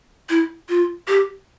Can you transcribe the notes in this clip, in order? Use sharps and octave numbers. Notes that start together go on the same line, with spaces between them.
E4
F4
G4